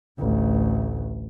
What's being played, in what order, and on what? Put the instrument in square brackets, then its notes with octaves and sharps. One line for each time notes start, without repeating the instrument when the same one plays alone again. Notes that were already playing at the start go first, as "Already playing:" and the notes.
[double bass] A1 D2